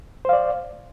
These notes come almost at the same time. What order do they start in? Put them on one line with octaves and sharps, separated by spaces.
C5 F5 D5